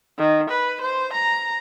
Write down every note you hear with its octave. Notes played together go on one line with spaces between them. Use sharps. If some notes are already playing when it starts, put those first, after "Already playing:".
D#3
B4
C5
A#5